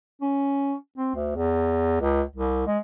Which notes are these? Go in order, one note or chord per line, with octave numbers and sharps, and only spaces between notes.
C#4
C4
D2
E2
C#2
C2
G#3